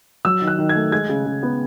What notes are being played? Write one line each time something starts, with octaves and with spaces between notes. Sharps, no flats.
F#3 E6
D#3
F#6
D#3
G#6
A3
G#3 G#6
C#3
C#3
B3